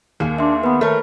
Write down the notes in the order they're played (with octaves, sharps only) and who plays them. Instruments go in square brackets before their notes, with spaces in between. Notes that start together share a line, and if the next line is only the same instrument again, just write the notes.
[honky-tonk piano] D#2 G#4 [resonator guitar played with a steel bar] A#3
[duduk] D4 [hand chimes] E5 C6
[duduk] B3 [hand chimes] B4 B5
[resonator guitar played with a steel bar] A3 C#5 [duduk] A#4